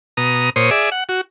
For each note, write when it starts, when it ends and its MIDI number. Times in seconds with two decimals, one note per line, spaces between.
0.17 0.50 47
0.17 0.50 82
0.17 0.50 87
0.56 0.70 46
0.56 0.70 72
0.56 0.70 73
0.56 0.70 87
0.71 0.90 68
0.71 0.90 74
0.71 0.90 76
0.92 1.04 78
1.09 1.21 66